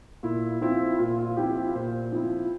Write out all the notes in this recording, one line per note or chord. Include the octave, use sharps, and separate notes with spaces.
A#2 E4
F3 C4 E4 F4
A#2 F4
F4
F3 C4 E4 G4
F4
A#2 C5
F3 C4 E4